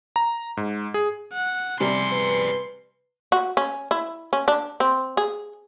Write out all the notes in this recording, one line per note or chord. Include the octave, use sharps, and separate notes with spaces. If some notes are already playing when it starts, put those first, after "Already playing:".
A#5
G#2
G#4
F#5
C3 G3 G#4 D5 C6
B4
F#4
C#4
E4
C#4
D4
C4
G#4